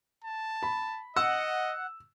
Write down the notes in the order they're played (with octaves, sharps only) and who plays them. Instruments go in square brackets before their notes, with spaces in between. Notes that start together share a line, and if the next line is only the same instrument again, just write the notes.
[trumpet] A5
[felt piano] B5
[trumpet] D#5 [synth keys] F#5 [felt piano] E6